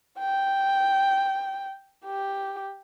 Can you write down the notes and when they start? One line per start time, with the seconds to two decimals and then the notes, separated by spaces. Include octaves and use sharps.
0.19 G5
2.05 G4